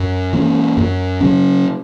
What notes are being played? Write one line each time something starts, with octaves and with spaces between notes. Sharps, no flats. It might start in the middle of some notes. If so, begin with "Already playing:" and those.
Already playing: F#2
E3 A#3 C#4
F#2
C#3 F#3 C#4